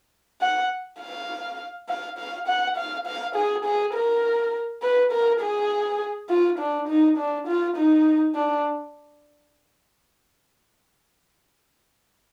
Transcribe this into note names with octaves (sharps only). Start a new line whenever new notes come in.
F#5
F5
F5
F5
F#5
F5
F5
G#4
G#4
A#4
B4
A#4
G#4
F4
D4
D#4
D4
F4
D#4
D4